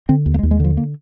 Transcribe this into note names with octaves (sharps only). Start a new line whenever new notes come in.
D3 C4
D#2
A#3
G#3
D#2
G#3
D3 F3
A#3